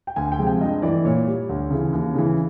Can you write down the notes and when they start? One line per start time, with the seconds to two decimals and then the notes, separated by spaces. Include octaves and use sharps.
0.07 G5
0.16 D2 G#5
0.32 G5
0.39 C3 F3 G#3
0.47 G5
0.61 G2 D#5
0.82 E3 A3 D5
1.05 A#2 C#5
1.26 G3
1.49 D2
1.70 C#3 E3
1.93 D#2
2.14 C#3 E3